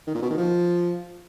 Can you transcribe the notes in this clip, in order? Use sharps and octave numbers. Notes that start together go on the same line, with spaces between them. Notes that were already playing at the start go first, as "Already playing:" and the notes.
D#3
A#2
B2
D#3
F3